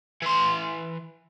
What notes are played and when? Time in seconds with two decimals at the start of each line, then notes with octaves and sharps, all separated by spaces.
0.22 E3 C6